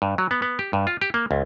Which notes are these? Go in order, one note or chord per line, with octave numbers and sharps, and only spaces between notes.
G2
F#3
B3
B3
G4
G2
F4
G4
A#3
C#2